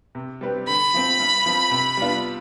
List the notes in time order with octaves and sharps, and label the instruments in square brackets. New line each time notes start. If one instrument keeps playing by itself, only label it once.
[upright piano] C3
G3 C4 G4 B4
[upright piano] D3 [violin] B5
[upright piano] F3 C4
G2
F3 C4
C3
G3 B3 D4 F4